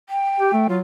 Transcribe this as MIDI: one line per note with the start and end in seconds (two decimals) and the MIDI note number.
0.09 0.67 79
0.40 0.53 67
0.53 0.68 57
0.69 0.80 54
0.69 0.77 65